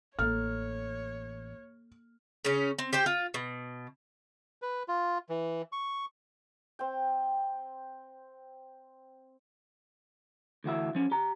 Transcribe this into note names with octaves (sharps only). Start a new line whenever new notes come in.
A1 A#3 A4 C#5 F6
C#3 C#4
C4
G4 C5 G5
F4
B2
B4
F4
E3
C#6
C4 G5
D2 E3 F#4 E5
F3 C#4
G4 A#5